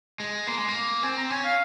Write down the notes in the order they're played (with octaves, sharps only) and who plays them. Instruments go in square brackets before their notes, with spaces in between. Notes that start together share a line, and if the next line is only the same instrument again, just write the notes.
[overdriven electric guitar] G#3
[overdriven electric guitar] A#3 [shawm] C6
[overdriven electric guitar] G#3
A#3
[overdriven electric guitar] C4 [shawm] G#5
[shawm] A#5
[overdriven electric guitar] C#4 [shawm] G#5
[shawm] F5